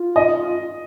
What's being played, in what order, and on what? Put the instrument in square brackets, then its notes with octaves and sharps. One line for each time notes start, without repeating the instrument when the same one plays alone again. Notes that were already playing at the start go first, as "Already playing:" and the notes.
Already playing: [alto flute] F4
[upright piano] D#5